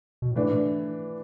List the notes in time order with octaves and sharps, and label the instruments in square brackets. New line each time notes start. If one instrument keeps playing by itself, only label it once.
[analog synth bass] B2
A2
[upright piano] E3 A3 D4